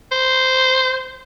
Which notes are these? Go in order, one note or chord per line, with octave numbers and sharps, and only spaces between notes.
C5